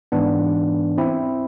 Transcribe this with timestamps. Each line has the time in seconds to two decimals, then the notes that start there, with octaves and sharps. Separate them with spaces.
0.12 G#2 E3 B3 D4
0.98 C4 E4